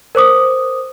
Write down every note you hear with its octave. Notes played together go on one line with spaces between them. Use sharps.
A#4 C5 D6 D#6